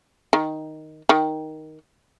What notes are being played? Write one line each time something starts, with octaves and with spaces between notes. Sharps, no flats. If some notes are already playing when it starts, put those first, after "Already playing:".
D#3
D#3